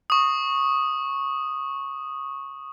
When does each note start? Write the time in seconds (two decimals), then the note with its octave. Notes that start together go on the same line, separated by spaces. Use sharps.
0.10 C#6 D#6